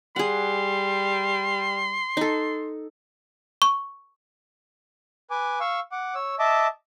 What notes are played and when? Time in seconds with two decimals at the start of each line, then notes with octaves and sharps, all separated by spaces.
0.16 G3 G#4 F#5 C6
2.17 D#4 A4
3.62 C#6
5.30 B4 G#5 D6
5.60 F5 C#6 E6
5.92 F#5 D6
6.15 C#5 E6
6.39 D#5 E5 A5 D6